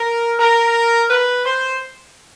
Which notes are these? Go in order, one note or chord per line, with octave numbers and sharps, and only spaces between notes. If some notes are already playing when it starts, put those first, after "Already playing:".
Already playing: A#4
A#4
B4
C5